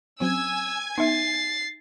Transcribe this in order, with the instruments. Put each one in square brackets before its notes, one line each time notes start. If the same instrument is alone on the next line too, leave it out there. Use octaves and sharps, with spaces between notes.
[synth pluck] F#3 C4 C#4 [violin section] G#5 G#6 [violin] E6
[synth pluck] B3 [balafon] D#4 E5 [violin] A6 C7